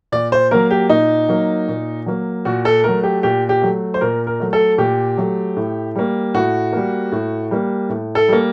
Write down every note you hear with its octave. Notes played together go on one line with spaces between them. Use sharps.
A#2 D5
C5
F#3 A#3 A#4
G4
A#2 D#4
F#3 A#3
A#2
F#3 A#3
A#2 F#4
A4
F#3 A3 A#4
G4
A#2 G4
G4
F#3 A3
C5
A#2 A#4
A#4
F#3 A3
A4
A#2 G4
F#3 A3
A2
G3 A#3
A2 F#4
G3 A#3
A2
G3 A#3
A2
A4
G3 A#3